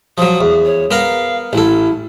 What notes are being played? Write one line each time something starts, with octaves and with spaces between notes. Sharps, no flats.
F3 F#3 D#6
E2
C#5
B3 A#4 F5 A#5
A1 E4 A4